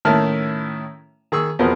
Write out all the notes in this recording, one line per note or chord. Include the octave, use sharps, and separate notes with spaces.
A2 D#3 C#4 E4 A5 F6
D#3 G#4 C#6 E6
E2 B2 F3 B3 C4 A#4